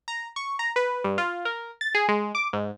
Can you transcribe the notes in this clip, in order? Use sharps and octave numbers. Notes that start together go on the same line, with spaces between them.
A#5
C#6
A#5
B4
G2
F4
A#4
A6
G#4
G#3
D6
G#2